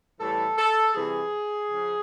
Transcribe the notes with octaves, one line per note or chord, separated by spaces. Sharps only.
A2 E3 G3 A4
A4
C3 E3 G3 G#4
C#3 F3